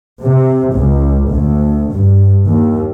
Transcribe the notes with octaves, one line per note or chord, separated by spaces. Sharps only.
C3
C#2
D2
G2
D#2